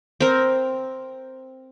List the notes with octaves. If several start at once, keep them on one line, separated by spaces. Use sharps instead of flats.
C4 A#4